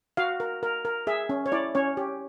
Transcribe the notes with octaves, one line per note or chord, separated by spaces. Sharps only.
F#4 F5
A#4
A#4
A#4
G#4 E5
C#4
C#5
E4 D5
C#4 C#5
G4